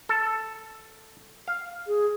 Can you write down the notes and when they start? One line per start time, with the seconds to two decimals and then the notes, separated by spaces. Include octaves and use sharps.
0.09 A4
1.48 F5
1.87 G#4